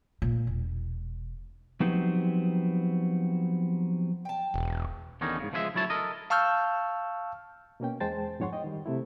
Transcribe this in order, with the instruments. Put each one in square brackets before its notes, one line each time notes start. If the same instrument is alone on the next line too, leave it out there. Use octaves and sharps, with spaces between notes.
[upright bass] A#2
E1
[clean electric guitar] F3 F#3 B3 C4 D#4 G4
[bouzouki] G5 A5
[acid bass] E1
[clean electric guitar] E2 D3 D#3 C#4 D#4
G#2 C#3
C#2 F3 G#3 G#4 B4 E5
D2 F#3 E4 C#5 A5
A4 A#4 D#5
[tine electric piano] F5 A5 C#6 E6 F6 G6
[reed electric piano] B2 A#3 C#4 G5
E2 G#3 C5 G5 A5 A6
F2 G#2 C#5 F#5 C6 C#6
D#5 G5
D#3 G3
C3 A3 E4